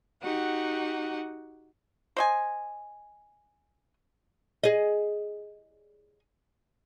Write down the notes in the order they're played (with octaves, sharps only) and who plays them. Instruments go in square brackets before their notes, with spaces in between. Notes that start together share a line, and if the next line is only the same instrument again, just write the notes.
[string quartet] D#4 F#4 G4 F#5
[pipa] C5 D#5 G#5
[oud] G#4 D#5